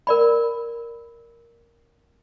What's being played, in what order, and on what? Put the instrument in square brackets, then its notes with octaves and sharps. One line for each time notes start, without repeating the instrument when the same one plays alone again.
[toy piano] A#4 D5 B5